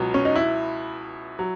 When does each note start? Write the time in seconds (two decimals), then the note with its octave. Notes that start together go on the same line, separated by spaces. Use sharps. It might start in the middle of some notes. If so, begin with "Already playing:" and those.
Already playing: C#2 B2 F#3
0.14 C#4
0.25 D#4
0.36 E4
1.39 F#3